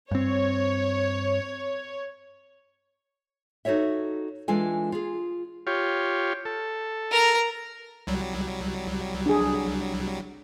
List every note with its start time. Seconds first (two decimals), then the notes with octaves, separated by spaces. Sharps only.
0.11 G2 C4 C#5
3.65 D#4 F#4 A4 C#5 E5
4.48 E3 G#3 D4 F4 A4 G#5
4.92 F4 G#4
5.67 F4 G4 C#5
6.45 A4
7.11 A#4 A#5
8.07 C2 F#3 G3
9.26 D4 G#4